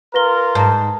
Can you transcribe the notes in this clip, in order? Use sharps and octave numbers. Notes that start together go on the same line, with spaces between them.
F4 A#4 B4 A#6 G7
G#2 A5 A#5